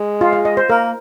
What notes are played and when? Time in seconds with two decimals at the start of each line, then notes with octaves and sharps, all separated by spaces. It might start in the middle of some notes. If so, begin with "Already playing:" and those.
Already playing: G#3
0.21 F4
0.33 F5
0.45 D#5
0.57 C5
0.70 A#3 A#4